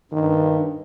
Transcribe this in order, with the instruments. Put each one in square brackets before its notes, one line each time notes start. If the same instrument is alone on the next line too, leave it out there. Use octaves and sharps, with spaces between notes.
[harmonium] G2 [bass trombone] D#3